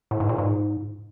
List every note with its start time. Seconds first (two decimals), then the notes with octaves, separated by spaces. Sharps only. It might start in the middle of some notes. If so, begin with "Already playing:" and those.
0.11 A2
0.20 G#2
0.29 A#2
0.38 G#2